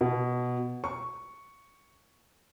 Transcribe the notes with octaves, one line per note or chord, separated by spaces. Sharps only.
B2
C#6